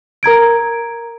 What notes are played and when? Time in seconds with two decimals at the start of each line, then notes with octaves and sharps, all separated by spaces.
0.23 A#4 A#5 G#6 D7